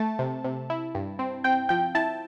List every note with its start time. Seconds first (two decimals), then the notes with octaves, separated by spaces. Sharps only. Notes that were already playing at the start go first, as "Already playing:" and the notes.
Already playing: A3 A5
0.19 C3
0.44 C3
0.70 E4
0.95 G2
1.19 C4
1.44 C4 G5
1.69 F3 G5
1.95 E4 A5